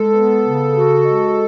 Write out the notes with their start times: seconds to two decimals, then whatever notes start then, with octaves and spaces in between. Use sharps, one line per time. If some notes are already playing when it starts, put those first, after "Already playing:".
Already playing: G#3 A4
0.13 B3
0.44 C#3
0.74 F#4
1.04 G#3